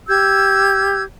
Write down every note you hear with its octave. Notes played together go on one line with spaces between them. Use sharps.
G4 E6 G6 G#6